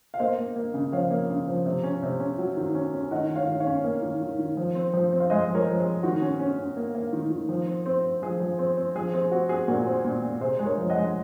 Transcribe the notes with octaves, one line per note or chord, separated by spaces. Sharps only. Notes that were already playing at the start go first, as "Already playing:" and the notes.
F5
A#3 C5 D#5
A#3
A#3
C#3
F3 C#5 F5
A#3
C#3
F3
C3
C#4
C3
C#4
F#3
D#3
C#4
C#4
D#3 D#5 F#5
D#3
C#5 F5
D#3
C#5 F5
C#4
A#3
D#3
D#3
D#3
F3
C4
F3
C4
F5
G#3 C5 D#5
F3
A#4 C#5
F3
G#4
C4
D#3 F#4
C#4
C#4
C#4
A#3
A#3
D#3
D#3
F3
C4
C4
C4
F3 G#4
F3
C4
C4
F3 G#4
C4 G#4
C4 F#4
C4 G#4
A#2 F#4 A#4
C4
A#2
A#2
C3 G#4 C5
G#3
A#4 C#5
F3
D#5 F#5
G#3